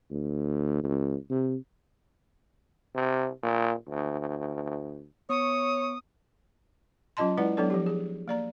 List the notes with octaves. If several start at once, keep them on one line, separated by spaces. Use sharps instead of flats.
D2
C#2
C3
C3
A#2
D2
B3 C#5 C#6 D#6 C#7
F#3 C#4 F4 D#5 A5 C6
G#3 E4 B4 D5 F#5
F#3 B3 D4 A4 D5
F3 G4
G#4
A#3 D5 A#5